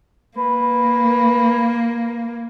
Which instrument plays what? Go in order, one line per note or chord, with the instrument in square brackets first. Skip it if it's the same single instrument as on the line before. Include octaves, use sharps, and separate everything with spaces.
[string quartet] A#3 [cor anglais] B4